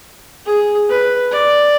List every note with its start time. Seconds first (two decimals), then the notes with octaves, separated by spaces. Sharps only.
0.46 G#4
0.89 B4
1.31 D5